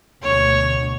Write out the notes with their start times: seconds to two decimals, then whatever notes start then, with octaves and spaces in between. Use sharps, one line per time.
0.23 D2 B2 D3 C#5